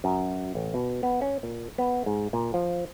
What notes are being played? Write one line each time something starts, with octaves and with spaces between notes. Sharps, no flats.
F#2
A1
B2
B3
C#4
A#2
B3
G#2
A#2
F3